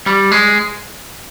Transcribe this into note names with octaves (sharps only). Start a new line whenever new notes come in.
G3
G#3